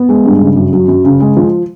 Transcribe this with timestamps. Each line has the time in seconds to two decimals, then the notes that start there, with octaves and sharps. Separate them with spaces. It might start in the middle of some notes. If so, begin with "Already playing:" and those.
Already playing: B3
0.09 G#3
0.25 G2
0.41 C#3
0.57 F#2
0.73 F#3
0.88 F#2
1.04 C#3
1.20 G#3
1.37 F3